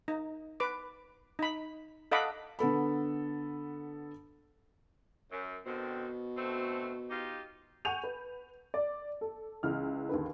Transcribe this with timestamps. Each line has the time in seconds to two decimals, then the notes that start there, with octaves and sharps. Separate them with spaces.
0.08 D#4
0.60 B4 D6
1.39 D#4 B5
2.11 A4 D#5 F5 F#5 B5 D6
2.59 D3 B3 A4 B5
5.32 F#2
5.66 B2 D3 D#3 C4
6.37 D2 A3 C4
7.10 D#4 F4 G4
7.85 F#5 G#5 C#6 G6 D#7 F7
8.04 B4
8.74 D5
9.21 A4
9.63 C#2 E3 F6
10.09 D#2 D3 B4